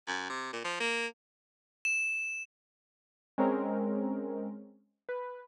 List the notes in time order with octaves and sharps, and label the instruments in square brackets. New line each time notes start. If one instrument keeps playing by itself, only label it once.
[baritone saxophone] F#2
C3
A#2
F3
A#3
[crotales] E7
[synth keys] G#3 C4 C#4 A#4
B4